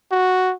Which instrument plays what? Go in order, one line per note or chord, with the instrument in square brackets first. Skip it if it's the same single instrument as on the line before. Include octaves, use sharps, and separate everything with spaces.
[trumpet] F#4